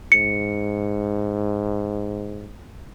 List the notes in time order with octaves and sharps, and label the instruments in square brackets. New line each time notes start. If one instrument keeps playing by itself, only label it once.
[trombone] G#2 [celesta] C#7